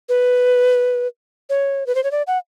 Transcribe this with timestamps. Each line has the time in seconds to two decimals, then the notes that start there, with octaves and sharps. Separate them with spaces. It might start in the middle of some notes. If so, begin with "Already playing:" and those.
0.09 B4
1.50 C#5
1.87 B4
1.95 C5
2.04 C#5
2.11 D5
2.27 F#5